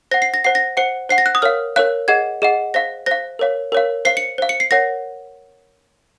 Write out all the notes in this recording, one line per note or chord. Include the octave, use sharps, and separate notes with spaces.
C5 F#5 A#6
C7
A#6
C5 F#5 C7
A#6
C5 F#5 C#7
C5 F#5 C7
A#6
F#6
D#6
A#4 C#5 F5 F6
A#4 C#5 F5 F#6
G#4 D#5 F#5 G#6
G#4 D#5 F#5
C5 F5 A#6
C5 F5 A#6
A#4 C#5 F5
A#4 C#5 F5
C5 F5 C7
C#7
C5 F5
C#7
C7
A#4 C#5 F#5 A#6